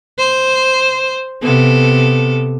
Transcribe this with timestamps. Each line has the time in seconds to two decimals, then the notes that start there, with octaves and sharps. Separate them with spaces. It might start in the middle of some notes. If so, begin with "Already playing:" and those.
0.18 C5
1.43 C3 B3 A4